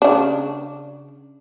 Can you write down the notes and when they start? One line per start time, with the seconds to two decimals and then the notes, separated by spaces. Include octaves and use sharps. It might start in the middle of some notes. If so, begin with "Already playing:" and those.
0.02 C#3 D4